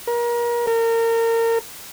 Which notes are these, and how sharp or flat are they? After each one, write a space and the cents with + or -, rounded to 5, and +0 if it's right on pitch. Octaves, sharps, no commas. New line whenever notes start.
A#4 +30
A#4 -30